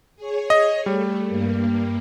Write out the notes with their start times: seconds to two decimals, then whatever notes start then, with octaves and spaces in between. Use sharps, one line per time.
0.16 G#4 C#5
0.50 D#5
0.86 G3 A3
1.26 G2 A#3